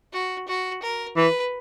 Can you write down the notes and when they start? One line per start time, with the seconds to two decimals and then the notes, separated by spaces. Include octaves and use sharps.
0.13 F#4
0.48 F#4
0.83 A#4
1.17 E3 B4